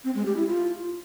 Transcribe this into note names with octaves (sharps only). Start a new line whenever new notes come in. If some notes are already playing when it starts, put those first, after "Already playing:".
C4
G#3
G4
E4
F4